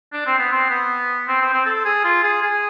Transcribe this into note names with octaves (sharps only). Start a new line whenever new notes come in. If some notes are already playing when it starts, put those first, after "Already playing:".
D4
C4
B3
C4
B3
C4
C4
C4
A4
G#4
F4
G#4
G#4